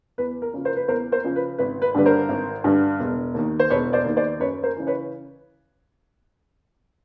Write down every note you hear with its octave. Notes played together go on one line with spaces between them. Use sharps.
E2 B4
A#4
C#3 F3
A#4 C5
B4
E2 A#4 C5
A#4 C5
C#3 F3
B4
G#1 B4
B4
G2 D3 G3 B4
A#4 C5
G#1
G2 D3 G3
E1
D#2 D#3
C5
E1 B4 C#5
C5 D5
D#2 D#3
C5 D5
F#2 B4 C#5
A#4 C5
C#3 E3
B4 C#5